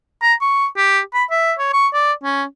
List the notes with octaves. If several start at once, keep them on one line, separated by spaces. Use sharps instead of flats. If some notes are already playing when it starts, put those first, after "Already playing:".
A#5
C#6
G4
B5
E5
C#5
C#6
D5
C#4